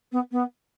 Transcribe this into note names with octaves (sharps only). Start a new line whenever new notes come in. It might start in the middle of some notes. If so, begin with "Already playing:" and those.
B3
B3